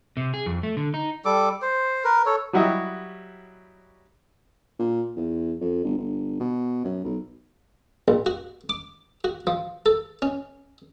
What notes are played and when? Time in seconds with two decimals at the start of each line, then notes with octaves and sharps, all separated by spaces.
0.17 C3
0.34 G#4
0.46 F2
0.63 A3
0.77 D3
0.94 D#4
1.25 G3 A4 D6
1.62 C5
2.04 A#4 B4
2.26 A4 C#5
2.53 F#3 G3 E4 F#4 G4 D#5
4.80 A#2
5.17 E2
5.61 F2
5.84 G1
5.98 G1
6.40 B2
6.85 F#2
7.04 B1
8.08 A#1
8.26 F#4
8.69 D6
9.24 F#4
9.47 F3
9.86 A4
10.22 C#4